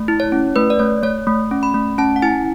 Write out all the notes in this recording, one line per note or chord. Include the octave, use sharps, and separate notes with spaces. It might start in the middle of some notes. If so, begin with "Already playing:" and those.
Already playing: A3
E4
C#5
C#4
A3 B4
D5
A3 C#5
A3 C#5
A3
C#4
B5
A3
C#4 A5
F#5
E4 G#5